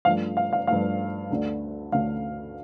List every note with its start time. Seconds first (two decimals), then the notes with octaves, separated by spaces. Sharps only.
0.05 G2 F3 A3 F5
0.37 F5
0.53 F5
0.67 G2 F3 A3 F5
1.30 D2 D3 A3
1.92 D2 D3 A3 F5